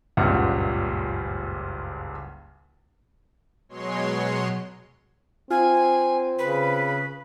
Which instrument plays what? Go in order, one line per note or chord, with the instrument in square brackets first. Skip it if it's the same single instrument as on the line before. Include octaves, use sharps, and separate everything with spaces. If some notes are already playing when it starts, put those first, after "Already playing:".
[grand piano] F#1 C#2 G2 A#2 F#5
[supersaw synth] B2 F#3 G#3 C#5 C6
[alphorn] C4 [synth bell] F4 [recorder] G#5
[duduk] C#3 [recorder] B4